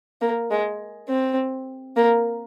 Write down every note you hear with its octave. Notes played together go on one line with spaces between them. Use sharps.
A#3
G#3
C4
A#3